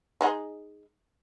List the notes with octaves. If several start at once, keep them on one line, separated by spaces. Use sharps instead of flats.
G#3 D#4 G#4